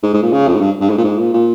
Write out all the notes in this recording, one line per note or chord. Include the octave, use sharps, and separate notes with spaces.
G#2
G#2
A#2
C#3
F2
G#2
G2
G2
G#2
A#2
G#2
A#2
A#2